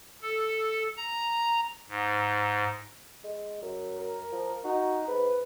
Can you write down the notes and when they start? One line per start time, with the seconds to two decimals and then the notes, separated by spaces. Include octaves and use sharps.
0.22 A4
0.97 A#5
1.89 G#2
3.24 G#3
3.62 F#2
3.99 A#4
4.32 F3
4.65 D#4 F#4
5.08 G#2 B4